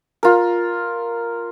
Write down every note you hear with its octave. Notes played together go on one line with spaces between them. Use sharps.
F4 A#4